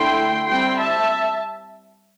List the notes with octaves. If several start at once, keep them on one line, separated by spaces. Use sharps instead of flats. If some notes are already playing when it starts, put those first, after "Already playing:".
Already playing: D3 A3 E4 G5 C6
G3 C4 E4 G5 C6
E5 A5